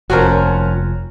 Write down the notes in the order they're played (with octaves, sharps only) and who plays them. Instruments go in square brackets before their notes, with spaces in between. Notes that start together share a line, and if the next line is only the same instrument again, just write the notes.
[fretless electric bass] F1 [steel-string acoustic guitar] D#2 F3 C#4 [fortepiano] F#4 A#4